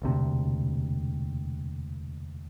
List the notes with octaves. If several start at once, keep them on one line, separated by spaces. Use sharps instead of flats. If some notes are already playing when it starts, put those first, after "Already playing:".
E1 D2 C3